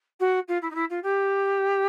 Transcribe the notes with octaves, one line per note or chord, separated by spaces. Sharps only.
F#4
F4
E4
D#4
E4
F4
G4